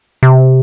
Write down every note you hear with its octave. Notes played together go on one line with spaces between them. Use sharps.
C3